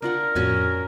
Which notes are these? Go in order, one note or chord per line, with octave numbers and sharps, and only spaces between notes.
D4 F4 A#4 F#5
F2 A2 C#4 F#4 G#5